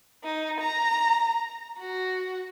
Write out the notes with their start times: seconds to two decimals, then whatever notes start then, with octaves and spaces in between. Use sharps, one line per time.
0.24 D#4
0.60 A#5
1.79 F#4